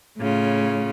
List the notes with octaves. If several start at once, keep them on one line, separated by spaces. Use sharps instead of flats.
A2 C#3 F4